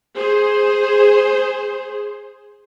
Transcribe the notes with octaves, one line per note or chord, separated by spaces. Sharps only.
G#4 C5